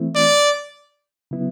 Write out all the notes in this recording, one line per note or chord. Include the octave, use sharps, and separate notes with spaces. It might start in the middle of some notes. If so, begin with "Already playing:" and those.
Already playing: E3 A3 C4 E4
D5
C#3 F#3 B3 E4